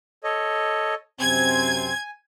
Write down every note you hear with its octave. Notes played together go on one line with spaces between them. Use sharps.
A4 C#5 D#5
F#2 C3 C4 G#5 G#6